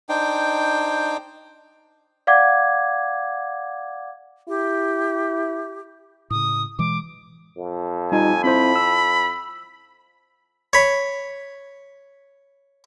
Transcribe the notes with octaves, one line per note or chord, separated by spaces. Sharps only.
D4 D#4 C5 G5
D5 F5 F#5 D6 G#6
E4 G4
A2 C#3 D#6
B2 E3 G#3 D6
F2
G3 D#4 F4 G#5
C4 E4 C5 B5
E6
C#5 B5